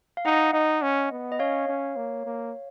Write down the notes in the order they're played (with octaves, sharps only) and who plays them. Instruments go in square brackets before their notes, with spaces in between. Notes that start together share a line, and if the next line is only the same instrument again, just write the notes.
[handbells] F5
[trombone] D#4 [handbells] D#5 F#5
[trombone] D#4
C#4
B3
[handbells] D#5
[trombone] C#4 [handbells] C#5 F5
[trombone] C#4
A#3
A#3